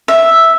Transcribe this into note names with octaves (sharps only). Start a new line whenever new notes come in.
E5